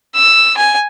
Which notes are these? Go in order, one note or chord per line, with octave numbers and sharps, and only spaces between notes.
E6
G#5